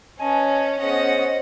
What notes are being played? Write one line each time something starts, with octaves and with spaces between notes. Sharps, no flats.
C#4 B4 D#5 G#5 A5
B3 C#4 G#4 C5 D#5 F#5